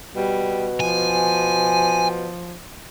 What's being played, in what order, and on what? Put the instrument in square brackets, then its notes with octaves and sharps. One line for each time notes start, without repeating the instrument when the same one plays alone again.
[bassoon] B2 [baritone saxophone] G3
[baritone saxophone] F3 [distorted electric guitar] G#5